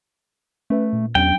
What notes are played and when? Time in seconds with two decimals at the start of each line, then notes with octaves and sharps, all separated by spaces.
0.70 A3 C#4 B4 E5
0.93 A#2
1.15 E2 F#3 C#4 D4 G5